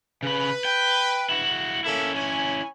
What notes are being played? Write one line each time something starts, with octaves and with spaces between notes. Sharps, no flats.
C#3 B4 B5
G5
E4 F#4
A#3 C#4 E4 A4 E5
C#5 G#5